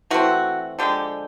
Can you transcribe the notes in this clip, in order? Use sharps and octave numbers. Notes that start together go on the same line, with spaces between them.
E3 A3 C4 F#4
D3 F3 G#3 G4